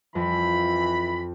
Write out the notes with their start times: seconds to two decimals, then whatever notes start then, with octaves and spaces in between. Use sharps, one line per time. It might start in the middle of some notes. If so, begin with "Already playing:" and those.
0.15 F2 E3 B5